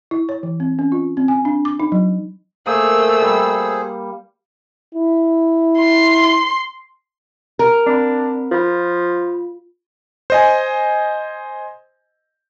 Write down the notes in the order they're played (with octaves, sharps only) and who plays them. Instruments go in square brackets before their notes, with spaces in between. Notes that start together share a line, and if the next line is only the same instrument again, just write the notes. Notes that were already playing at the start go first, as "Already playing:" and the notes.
[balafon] E4
C#5
E3
C4
C#4
F4
C4
G#5
D4
D6
D#4
F#3
[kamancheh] A3 E6 [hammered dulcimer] A#3 [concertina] G#4 C5
[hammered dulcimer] G3
[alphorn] E4
[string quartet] C6
[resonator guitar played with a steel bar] A#4
[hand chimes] C4 B5 [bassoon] D4
[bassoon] F3 [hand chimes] F4 B5
[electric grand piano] C5 D#5 G#5